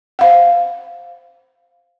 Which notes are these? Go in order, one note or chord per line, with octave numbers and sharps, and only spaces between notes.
C5 F5 F#5